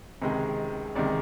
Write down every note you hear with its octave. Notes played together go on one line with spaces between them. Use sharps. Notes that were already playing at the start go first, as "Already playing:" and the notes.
C#2 C3 D#3 G#3
C#2 C3 D#3 G#3 D5